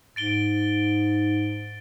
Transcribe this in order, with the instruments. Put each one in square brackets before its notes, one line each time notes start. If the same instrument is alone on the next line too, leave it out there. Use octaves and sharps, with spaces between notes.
[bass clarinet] G#2 [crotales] A6 D7 G7